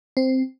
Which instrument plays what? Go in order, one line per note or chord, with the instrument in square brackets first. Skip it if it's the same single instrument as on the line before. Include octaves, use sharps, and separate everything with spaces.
[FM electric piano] C4